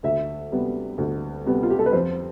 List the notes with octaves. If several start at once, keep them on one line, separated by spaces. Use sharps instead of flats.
D2 E5
C3 G3 B3
D2
C3 G3 B3
F4
G4
A4
B4
F2 C5